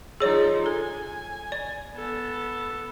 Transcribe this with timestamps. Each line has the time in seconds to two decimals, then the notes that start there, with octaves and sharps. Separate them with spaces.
0.20 F3 D#4 G#4 C#5 D5
0.66 A4 G#5
1.52 D5
1.95 B3 A4